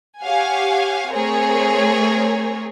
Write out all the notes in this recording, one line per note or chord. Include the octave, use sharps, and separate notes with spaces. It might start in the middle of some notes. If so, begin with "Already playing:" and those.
G4 C#5 F5 F#5 G#5
A3 C4 G#4 A#4 C5 C#5